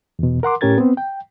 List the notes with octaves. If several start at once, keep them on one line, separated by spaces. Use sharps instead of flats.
E2 B2
A#4 F#5 C6 D6
A2 C#4 G4 A#4 G#6 A6
B3 C4
G5